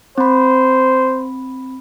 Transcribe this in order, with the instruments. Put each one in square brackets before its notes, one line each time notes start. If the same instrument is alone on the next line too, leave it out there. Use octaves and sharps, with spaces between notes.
[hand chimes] C4 B5 [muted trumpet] C5